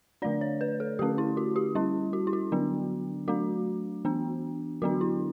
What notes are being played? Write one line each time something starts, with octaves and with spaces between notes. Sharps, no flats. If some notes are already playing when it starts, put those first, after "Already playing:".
D3 A3 D4 D5
C#5
B4
A4
D3 A3 C#4 G4
E4
F#4
G4
G3 C#4 E4
F#4
E4
F#4
D3 F#3 B3 D4
F#3 A3 D4 F#4
E3 B3 D4
D3 F#3 B3 D4 F#4
E4